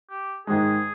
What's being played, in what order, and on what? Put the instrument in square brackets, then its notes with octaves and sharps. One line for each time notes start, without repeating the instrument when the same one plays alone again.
[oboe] G4
[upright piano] G#2 D#3 G#3 [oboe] G#4